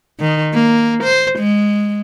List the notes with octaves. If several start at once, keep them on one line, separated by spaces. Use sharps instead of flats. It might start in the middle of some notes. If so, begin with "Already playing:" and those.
D#3
A#3
C5
G#3